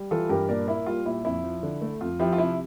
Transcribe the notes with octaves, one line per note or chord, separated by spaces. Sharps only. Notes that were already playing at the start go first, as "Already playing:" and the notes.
Already playing: G3
E3 F4 A4
G2 G4 A#4
A#2 A#4 D5
A#3 E4
G3 F4
A#2 E4
F2 E4
F3
D3
A3
F2 F4
F3 E4 G4
F4
C3 E4